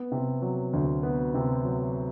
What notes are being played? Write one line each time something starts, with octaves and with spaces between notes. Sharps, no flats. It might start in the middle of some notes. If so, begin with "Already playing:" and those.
Already playing: B3
C3
F#3
D2
B3
C3
F#3